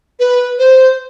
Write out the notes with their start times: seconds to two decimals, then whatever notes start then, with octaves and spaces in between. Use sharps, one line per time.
0.20 B4
0.59 C5